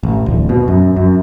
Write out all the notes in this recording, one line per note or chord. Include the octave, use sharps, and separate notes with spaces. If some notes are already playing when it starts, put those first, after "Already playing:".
A1
D1
B2
F#2
F#2